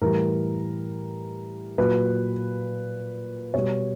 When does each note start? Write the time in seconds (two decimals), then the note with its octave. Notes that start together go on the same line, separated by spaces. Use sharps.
0.01 A2 E3 G3 A#4
1.78 A#2 F#3 B4
3.54 B2 G3 C#5